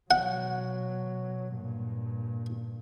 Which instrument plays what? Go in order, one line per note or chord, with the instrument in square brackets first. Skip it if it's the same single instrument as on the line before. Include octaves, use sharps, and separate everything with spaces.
[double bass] B2 F#3 [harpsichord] F#5
[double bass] G2 A#2